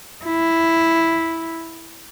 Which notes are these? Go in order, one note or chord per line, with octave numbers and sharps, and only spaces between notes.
E4